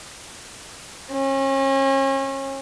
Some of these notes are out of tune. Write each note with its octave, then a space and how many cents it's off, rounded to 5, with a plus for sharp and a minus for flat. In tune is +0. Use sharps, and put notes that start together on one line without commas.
C#4 -35